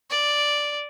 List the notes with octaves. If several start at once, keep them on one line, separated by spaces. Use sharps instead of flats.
D5